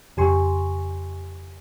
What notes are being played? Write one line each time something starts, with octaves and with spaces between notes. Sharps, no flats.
F2 C#3 G4 G#5 C6 C#6